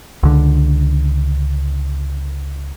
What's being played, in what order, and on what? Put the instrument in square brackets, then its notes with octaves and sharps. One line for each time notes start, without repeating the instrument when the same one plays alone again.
[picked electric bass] C#2 D3